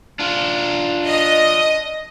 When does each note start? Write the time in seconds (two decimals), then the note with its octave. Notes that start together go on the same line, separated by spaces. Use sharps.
0.19 D4 F4
1.08 D#5